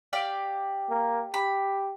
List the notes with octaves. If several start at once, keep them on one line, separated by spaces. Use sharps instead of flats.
G4 D5 F5
A#3
G4 B5